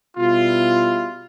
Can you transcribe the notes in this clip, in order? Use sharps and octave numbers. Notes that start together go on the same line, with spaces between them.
B2 G3 E4 F4